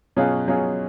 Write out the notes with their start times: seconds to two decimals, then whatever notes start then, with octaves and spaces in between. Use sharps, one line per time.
0.16 B2 F#3 C#4 F4 G#4
0.48 B2 F#3 C#4 F4 G#4